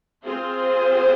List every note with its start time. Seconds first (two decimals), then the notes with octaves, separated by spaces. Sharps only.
0.25 C4 F4 G#4 C5